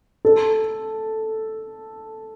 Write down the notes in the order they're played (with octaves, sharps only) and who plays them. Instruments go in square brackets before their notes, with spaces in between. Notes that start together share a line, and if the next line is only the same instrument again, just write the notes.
[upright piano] A4